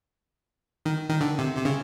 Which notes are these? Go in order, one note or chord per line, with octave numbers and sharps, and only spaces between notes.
D#3
D#3
D3
C3
C3
C#3